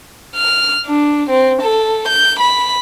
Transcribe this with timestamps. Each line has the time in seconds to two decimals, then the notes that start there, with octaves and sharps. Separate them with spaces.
0.36 F6
0.86 D4
1.30 C4
1.61 A4
2.08 G6
2.39 B5